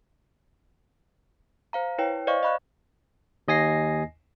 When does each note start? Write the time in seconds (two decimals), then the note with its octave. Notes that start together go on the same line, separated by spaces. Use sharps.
1.73 C5 F5 A#5
1.98 E4 B4 C#5 G5
2.27 C5 D5 D#5 F5 C#6
2.43 D#5 F5 B5 C#6 F#6
3.48 D#2 D#5 G#5 A#6 C7